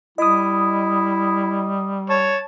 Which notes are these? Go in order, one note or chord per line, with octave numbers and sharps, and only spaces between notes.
G3 E4 D#5 D#6
C#5 A5